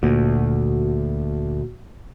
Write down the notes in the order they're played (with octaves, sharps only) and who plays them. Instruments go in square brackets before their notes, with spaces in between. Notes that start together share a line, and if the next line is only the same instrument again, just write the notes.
[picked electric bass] D2 [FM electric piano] A#2 F#4